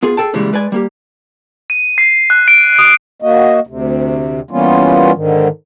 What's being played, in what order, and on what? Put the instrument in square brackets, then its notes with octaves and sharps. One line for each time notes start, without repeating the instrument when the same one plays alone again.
[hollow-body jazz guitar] B3 F4 G#4
G#4 A4 G5 A5
A#2 C#3 E3 G3 G#3
G#3 B4 D5 G#5
G3 A#3 G4
[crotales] D#7
C7
F#6
D7
D#6
[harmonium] A#3 F#4 D#5
D2 C3
E3 G3 A#3 B3 C#4 F4
G#2 D3 D#3